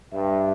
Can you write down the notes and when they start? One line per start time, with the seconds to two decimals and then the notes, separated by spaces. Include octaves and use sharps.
0.12 G2 E5